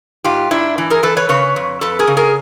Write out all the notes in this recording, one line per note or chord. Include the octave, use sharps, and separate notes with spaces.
G#2 F4 G4
G#2 D4 E4
E3
G#4 A#4
E3 A4 B4
B4 C#5
C#3 B4 C#5
F2
F2 A4 B4
G#4 A#4
C#3
G#4 A#4